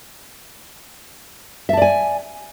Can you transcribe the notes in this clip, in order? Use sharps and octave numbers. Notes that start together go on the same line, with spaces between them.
D5 E5 G#5 A5